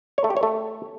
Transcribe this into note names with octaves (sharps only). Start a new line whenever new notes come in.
C#5
A3
G4
C#5
A3